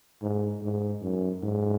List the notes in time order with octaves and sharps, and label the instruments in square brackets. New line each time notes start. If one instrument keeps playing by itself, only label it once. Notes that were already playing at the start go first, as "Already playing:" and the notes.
[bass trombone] G#2
G#2
F#2
G#2